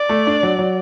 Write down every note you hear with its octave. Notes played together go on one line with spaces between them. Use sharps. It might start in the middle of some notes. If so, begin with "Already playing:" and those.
Already playing: D5
A3
D4
F#3
F#3